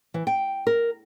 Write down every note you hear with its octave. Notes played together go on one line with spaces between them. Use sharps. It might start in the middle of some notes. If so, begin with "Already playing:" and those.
E3
G5
A#4